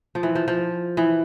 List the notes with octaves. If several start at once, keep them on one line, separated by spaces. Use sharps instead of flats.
F3
E3
F3
F3
E3